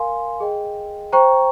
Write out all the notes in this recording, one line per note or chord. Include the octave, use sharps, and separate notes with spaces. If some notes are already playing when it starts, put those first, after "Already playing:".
Already playing: A#4 F5 G#5 C6
G#4 D#5 G5
C5 G5 A#5 C#6